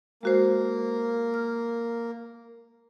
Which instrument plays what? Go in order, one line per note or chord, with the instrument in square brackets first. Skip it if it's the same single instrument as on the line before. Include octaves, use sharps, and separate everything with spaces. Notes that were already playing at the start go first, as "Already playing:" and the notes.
[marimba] G#3 F#4 C5 [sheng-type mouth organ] A#3
[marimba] F6